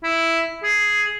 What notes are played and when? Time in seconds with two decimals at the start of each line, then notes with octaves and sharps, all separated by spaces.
0.04 E4
0.64 G#4